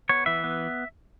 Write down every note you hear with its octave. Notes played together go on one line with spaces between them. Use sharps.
B3 C#5
E3 E5
B3